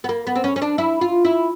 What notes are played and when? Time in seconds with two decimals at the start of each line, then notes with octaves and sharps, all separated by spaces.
0.04 B3
0.09 A#3
0.27 B3
0.36 C4
0.44 C#4
0.56 C#4
0.62 D4
0.78 E4
1.01 F4
1.25 E4